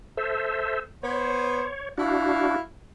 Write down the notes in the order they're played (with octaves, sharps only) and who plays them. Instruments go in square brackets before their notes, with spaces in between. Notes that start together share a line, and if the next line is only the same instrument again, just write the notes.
[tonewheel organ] A4 C5 E5
[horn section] B3 C5 [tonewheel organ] C#5
[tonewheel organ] D4 F#4 [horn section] E4 F5